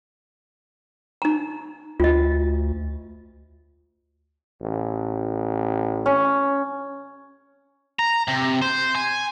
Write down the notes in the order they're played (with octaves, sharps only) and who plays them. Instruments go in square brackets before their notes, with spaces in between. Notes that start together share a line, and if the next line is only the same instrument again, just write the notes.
[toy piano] D#4 A#5
[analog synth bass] D2 [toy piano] F4 D#5
[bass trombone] A1
[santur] C#4
[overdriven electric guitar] A#5
C3
C5
G#5